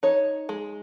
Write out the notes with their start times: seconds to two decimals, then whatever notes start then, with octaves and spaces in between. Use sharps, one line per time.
0.03 D#4 C#5
0.49 G#3